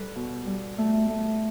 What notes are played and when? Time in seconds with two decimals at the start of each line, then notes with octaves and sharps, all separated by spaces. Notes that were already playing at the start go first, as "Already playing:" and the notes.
Already playing: G3 A4 B4
0.16 B2
0.47 G3
0.78 A3
1.10 A3